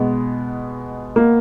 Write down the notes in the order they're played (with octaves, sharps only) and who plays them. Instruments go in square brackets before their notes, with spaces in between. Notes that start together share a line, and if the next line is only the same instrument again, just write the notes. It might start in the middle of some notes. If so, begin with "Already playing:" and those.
Already playing: [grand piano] B2 G#3 B3
[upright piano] A#3